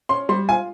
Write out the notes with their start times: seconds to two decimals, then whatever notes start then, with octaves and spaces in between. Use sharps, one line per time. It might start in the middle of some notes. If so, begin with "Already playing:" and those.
0.09 C#4 C6
0.29 G3 C6
0.49 F4 G#5